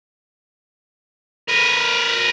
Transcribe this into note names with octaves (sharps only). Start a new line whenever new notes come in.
A#4 B4